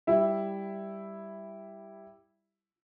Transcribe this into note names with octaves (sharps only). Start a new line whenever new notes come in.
G3 E4 E5